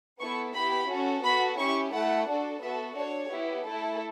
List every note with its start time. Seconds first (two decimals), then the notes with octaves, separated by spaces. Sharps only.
0.20 B3 E4 A4 C#6
0.55 B3 E4 G4 B5
0.89 C#4 F#4 A4
1.24 B3 F#4 A4 B5
1.58 C#4 E4 G4 C#6
1.93 A3 E4 A4 F#5
2.28 D4 F#4 A4
2.62 B3 F#4 A4 E5
2.96 D4 A4 C#5
3.31 B3 E4 G4
3.66 A3 E4 A4